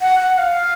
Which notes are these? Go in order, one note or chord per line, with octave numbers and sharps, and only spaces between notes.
F#5
F#5
F5